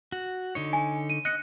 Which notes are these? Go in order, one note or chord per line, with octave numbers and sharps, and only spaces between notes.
F#4
D3 D#4 C#5
G#5
D#7
D#5 F#6 C#7